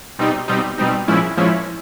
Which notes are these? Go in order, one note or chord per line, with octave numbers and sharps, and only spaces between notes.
B2 G3 C4 D#4
B2 G3 C4 D#4
B2 G3 C4 D#4
A#2 F3 G#3 C#4 E4
A#2 F3 G#3 C#4 E4